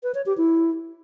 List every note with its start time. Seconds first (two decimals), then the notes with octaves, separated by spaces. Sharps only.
0.03 B4
0.15 C#5
0.26 G4
0.37 E4